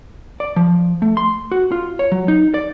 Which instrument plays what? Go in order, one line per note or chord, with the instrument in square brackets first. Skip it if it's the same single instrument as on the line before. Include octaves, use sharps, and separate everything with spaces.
[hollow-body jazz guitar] D5
F3
A3
C6
F#4
F4
C#5
F#3
D#4
D5